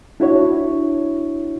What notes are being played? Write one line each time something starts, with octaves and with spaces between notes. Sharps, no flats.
D4 E4 F#4 C#5